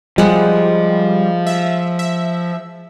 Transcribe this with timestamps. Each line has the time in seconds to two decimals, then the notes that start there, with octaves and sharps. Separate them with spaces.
0.18 F3 G3 G#3 F#5
1.47 E5
1.99 E5